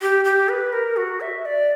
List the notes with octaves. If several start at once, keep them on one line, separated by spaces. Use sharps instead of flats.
G4
G4
B4
A#4
F#4
E5
D5